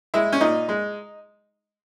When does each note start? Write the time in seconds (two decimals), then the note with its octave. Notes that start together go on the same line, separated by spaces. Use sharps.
0.14 G#3 E4
0.32 C#4
0.41 A#2 D#4
0.69 G#3